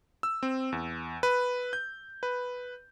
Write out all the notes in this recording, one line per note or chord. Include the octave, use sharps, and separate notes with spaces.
E6
C4
E2
B4
G6
B4